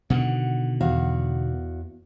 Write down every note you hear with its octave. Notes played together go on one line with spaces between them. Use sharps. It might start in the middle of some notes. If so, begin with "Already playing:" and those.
B2 D3 D#3 F#5
E2 F#4 F5